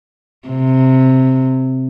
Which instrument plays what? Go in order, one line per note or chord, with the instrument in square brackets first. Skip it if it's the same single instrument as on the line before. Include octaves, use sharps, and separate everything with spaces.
[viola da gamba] C3